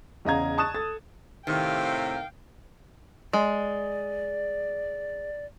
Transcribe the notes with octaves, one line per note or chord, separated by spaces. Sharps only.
E2 C#3 D#5 F5 A#5 G#6
A5 C#6 D#6 F#6 A6 E7
A4 A6
A2 C3 D#3 F5 G5
G#3 D5